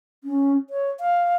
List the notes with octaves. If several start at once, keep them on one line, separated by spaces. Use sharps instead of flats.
C#4
C#5
F5